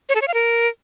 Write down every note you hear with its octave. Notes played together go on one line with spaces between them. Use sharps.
C#5
A4
C#5
F5
A#4